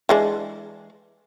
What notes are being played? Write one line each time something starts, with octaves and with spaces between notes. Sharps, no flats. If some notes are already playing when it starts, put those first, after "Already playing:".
E3 G#3 D4